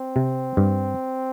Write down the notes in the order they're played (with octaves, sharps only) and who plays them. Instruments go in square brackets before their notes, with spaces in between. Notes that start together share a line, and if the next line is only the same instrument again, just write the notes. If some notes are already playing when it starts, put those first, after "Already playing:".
Already playing: [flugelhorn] C4
[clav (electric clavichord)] C3
G2